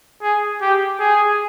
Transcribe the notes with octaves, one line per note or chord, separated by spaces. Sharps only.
G#4
G4
G#4